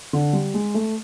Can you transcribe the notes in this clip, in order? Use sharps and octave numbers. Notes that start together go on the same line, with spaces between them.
D3
G3
G#3
A3